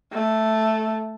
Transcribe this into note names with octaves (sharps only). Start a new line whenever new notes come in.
A3